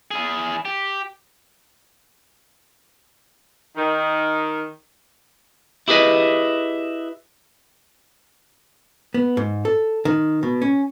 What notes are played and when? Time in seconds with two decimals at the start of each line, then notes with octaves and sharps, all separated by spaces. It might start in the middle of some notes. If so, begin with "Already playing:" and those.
0.11 E4 G#4
0.65 G4
3.76 D#3
5.88 E4 G4 G#4 B4 D#5
9.14 B3
9.37 G#2
9.65 A4
10.05 D#3
10.43 B2
10.62 C#4